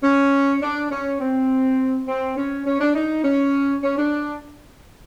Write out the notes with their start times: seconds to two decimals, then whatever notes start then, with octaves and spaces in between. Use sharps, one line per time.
0.04 C#4
0.62 D4
0.91 C#4
1.20 C4
2.08 C4
2.37 C#4
2.66 C#4
2.81 D4
2.95 D#4
3.24 C#4
3.83 C#4
3.98 D4